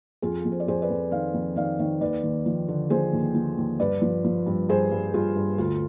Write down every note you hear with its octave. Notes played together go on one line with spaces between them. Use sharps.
F2 F4 G#4
F2
C5
D5
F2 G#4 C5
B4 D5
F2
D#3 D5 F5
F2
D#3 D5 F5
D#3
D#2 B4 D5
D#2
F3
D3
F3 G#4 C5
D#2
F3
D#2
G2 B4 D5
F3
F3
G2
G2 G#4 C5
G2
G2 F4 G#4
G2
D2 F4